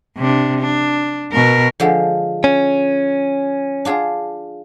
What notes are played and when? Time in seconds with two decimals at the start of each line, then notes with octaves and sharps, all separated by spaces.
0.18 C3 D4
0.61 D4
1.32 B2 A#4
1.80 D3 F3 G#3
2.44 C#4
3.85 D4 F4 G#4